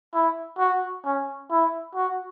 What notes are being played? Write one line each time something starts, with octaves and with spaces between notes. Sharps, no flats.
E4
F#4
C#4
E4
F#4